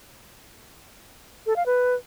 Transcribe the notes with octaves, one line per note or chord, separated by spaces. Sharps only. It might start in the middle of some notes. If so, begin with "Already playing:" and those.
A4
F5
B4